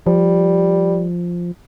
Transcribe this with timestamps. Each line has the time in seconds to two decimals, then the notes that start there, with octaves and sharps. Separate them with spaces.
0.07 F3 G3